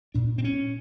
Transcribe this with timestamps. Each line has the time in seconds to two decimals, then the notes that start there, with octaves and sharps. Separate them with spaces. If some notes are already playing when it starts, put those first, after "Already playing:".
0.14 A#2 D4
0.38 C4
0.44 C#4